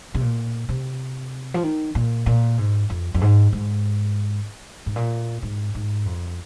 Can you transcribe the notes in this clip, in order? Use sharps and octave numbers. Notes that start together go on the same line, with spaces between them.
C3
A#2
C3
F3
D#3
A#2
A#2
G#2
F2
F2
G#2
G#2
G#2
A#2
G#2
G#2
F2